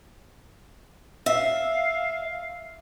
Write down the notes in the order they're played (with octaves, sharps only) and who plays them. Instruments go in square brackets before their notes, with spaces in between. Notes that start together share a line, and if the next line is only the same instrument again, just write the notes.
[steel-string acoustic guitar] E5 [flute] F5